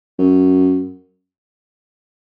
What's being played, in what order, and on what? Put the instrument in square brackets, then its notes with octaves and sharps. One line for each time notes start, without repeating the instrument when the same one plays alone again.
[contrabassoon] F#2